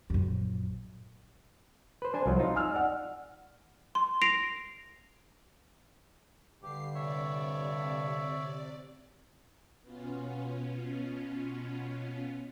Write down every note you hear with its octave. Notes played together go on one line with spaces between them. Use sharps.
A#1 F#2
B4 C5
D4 C5 G#5
C2 F3 F#3
D#4 F4
G#5 E6 F6
D5 F#5
C6
A#6 C7 D7 F7
G2 D3 G4 C7
C3 C#5 D5 E5
B2 B3 C#4 F4